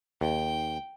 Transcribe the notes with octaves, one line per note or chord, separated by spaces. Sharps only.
D#2 G5